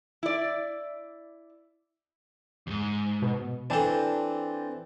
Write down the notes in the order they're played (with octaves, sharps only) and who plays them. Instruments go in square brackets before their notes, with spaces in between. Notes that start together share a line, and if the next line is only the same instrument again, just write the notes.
[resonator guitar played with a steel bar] E4 D5
[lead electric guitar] D#2 G#2
[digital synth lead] B2
[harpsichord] E3 A4 [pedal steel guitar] C4 D4